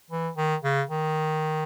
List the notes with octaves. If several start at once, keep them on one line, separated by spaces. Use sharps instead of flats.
E3
D#3
C#3
D#3